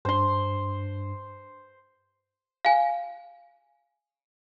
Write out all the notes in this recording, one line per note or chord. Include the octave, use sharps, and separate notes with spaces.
G2 D4 C5 C6
F5 G#5